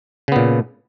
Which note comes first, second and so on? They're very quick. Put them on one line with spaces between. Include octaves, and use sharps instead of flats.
C#3 B3 A#2